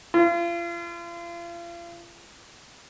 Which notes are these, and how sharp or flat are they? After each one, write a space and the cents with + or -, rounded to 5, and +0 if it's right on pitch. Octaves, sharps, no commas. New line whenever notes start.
F4 -35